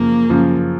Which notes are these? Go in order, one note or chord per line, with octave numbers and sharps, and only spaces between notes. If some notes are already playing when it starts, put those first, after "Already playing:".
Already playing: F#2 C#3 F3 A#3
F#2 C#3 F3